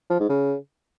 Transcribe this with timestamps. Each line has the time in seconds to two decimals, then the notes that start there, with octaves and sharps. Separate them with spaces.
0.10 F3
0.19 G#2
0.29 C#3